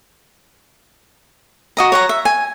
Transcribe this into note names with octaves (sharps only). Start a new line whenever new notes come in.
F#4 D#5 A#5
C#5 F#5 A#5
E5
G#5